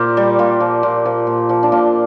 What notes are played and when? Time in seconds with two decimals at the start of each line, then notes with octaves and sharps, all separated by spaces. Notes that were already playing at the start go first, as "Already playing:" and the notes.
Already playing: A#2 G4 A#4 C5
0.17 G3
0.39 A#2 F4
0.60 F3
0.83 A#2
1.05 F3
1.27 A#2
1.49 F3
1.63 D4
1.72 A#2 F4